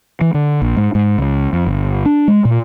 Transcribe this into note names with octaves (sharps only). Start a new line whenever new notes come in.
E3
D3
A#1
G#2
G#2
C#2
F2
G1
D4
G#3
A#2